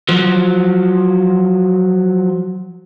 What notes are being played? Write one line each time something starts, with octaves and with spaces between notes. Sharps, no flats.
F3 F#3